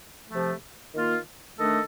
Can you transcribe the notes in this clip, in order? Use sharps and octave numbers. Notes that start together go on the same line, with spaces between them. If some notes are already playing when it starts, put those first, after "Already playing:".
C3 F3 A3
D#3 A#3 F4
D#3 A3 D4 A4 D#5